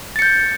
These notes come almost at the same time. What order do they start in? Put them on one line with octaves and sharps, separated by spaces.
A6 C#7 G6